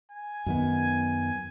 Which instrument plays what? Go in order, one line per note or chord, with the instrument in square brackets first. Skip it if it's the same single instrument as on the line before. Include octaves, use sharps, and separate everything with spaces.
[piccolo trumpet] G#5
[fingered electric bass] F#2 D#3 B3